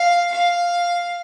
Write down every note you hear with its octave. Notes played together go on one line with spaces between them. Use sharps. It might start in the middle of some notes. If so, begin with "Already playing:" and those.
Already playing: F5
F5